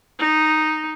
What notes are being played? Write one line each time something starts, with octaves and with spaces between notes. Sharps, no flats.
D#4